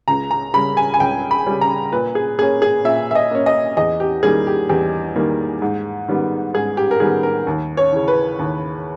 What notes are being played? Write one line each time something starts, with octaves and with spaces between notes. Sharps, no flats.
C#2 A#5
A#5
C#3 G3 B5
G#5
G#5
C#2 G5
B5
C#3 G3
A#5
A#2 B4
G#4
A#3 C#4 G#4
G#4
A#2 E5
E5
D#5
A#3 C#4
D#5
E2 D#5
G4
D#3 G3 A#3 G#4
G4
E2 G4
D#3 G3 A#3
G#2
D#3 G3 B3
G#2 G#4
G4
A#4
D#3 G3 B3 G#4
A#4
D#2
C#5
C#3 E3
B4
D#2